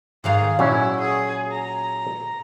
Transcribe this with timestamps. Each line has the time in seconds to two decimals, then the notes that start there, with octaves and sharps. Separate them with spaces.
0.24 G#2 D#3 G#4 F5
0.59 A#2 F#3 C#4 E4 C#5
1.00 G#4
1.51 A#5